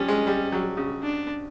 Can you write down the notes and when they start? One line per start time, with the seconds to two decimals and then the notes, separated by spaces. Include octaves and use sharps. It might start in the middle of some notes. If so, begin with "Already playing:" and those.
Already playing: F3 G3 C#4
0.08 G#3
0.27 G3
0.52 F#3
0.77 C#3
1.03 D4